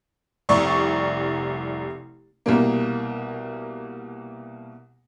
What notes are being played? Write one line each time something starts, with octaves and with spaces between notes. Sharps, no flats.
F1 C2 D5 C#6
C2 B2 A#3